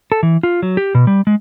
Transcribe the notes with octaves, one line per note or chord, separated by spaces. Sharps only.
A4
E3
F4
F#3
G4
B2
G3
G#3